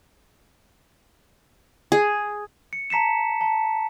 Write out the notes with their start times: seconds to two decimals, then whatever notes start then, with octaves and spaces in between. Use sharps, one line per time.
1.92 G#4
2.73 C#7
2.90 A5 A#5 B6 C#7 E7
3.41 A5